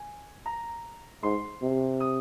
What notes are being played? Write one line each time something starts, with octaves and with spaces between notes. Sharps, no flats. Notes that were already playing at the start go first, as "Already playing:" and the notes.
Already playing: G#5
A#5
G#2 C6
C3
D#6